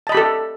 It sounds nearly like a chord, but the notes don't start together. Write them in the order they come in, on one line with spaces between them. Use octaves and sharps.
A5 D#5 B5 G4 A4